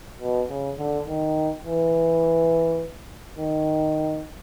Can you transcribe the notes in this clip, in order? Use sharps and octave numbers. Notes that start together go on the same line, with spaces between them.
B2
C#3
D3
D#3
E3
D#3